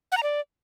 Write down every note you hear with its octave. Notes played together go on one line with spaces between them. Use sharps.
F#5
A#5
D5